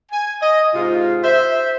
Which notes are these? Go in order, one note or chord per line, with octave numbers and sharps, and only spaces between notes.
G#5
D#5
G#2 C3 F4
C5 E5